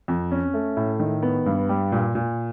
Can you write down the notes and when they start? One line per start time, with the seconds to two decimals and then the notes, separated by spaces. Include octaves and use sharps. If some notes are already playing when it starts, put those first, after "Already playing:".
0.08 F2
0.31 C#4
0.54 A3
0.77 A2
1.00 D#3
1.23 B3
1.46 G2
1.69 G3
1.92 A#2
2.15 A#2